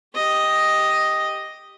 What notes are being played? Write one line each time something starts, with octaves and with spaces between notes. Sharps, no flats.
G4 D#5